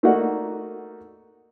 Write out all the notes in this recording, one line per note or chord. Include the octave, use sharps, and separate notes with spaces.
A3 A#3 D#4 F#4 D5 F#5